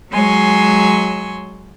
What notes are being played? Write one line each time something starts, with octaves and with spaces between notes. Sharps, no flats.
F#3 G#3 C#5 G#5 C6 E6